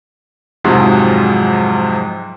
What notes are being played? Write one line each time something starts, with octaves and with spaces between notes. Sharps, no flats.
F2 G#2 C3 F3 F#3 G#3